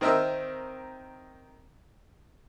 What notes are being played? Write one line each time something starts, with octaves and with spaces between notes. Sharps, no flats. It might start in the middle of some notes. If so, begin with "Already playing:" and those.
D#3 C4 A#4 D#5 E5 E6